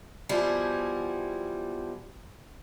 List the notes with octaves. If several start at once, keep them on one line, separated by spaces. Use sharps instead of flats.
B2 F3 G3 E4 G#4